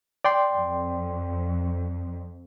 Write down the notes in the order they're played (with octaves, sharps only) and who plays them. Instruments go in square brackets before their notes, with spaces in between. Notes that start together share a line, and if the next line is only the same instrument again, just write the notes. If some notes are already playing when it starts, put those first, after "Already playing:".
[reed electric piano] D5 G5 C6
[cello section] F2